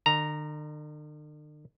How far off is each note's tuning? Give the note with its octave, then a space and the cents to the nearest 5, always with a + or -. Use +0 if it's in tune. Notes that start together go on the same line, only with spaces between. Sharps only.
D3 +45 A#5 +0